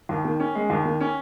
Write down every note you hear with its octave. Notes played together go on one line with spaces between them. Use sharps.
D#2
D#3
C#4
G#3
D#2
D#3
C#4